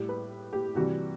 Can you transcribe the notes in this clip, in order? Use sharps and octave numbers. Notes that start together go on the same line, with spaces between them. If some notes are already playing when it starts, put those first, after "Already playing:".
Already playing: A2 G3 G4
B4
G4
C3 E3 G3 F#4